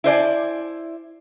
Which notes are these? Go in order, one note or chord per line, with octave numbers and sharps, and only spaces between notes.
E4 C5 D5 G#5